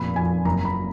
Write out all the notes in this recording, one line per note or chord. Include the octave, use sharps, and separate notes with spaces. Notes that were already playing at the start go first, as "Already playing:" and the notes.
Already playing: F1 A#2 B5
F2 G#5
F#1 A#5
B5